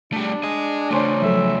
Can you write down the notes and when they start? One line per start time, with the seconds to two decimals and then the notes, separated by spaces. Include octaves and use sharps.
0.12 G3 A3 D4
0.44 G#4 D#5
0.91 C#3 A3 C#4 C5 D5
1.22 F3 F#3 A4 E5